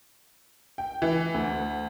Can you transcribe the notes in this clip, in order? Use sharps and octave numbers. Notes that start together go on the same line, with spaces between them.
G5
E3
D2